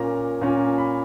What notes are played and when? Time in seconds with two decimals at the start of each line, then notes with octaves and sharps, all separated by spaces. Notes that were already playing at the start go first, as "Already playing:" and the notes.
Already playing: A#2 A#3 C#4 A#5
0.41 A#2 A#3 C#4
0.78 B5